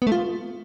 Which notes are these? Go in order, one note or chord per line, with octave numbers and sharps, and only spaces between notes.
B3
A3
F4